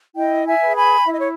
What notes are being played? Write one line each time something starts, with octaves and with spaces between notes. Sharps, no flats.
E4 D#5 G5
E5 G#5
G#4 B4
G#5 B5
E4 E5
D#5
C#5